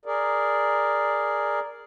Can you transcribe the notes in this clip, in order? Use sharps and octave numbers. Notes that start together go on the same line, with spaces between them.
G#4 A#4 D5